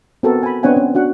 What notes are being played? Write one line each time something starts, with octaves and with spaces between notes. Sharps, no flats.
B3 C4 F#4 A4 A#4
G#5 B5
B3 C4 D4 C#5 F#5 G#5
C#4
D4 F#4 F#5